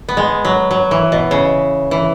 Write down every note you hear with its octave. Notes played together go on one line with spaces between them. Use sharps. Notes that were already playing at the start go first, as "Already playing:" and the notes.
B3
G#3
F#3
F#3
E3
B2
C#3
E3